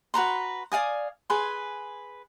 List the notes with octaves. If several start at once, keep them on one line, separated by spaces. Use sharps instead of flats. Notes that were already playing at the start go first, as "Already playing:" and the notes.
F#4 B4 A#5 C6
D5 F5 G#5 D#6
G#4 B4 G#5 C6